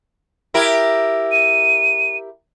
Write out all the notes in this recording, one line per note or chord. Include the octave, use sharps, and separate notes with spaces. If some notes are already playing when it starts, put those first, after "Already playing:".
E4 G4 A#4
D#7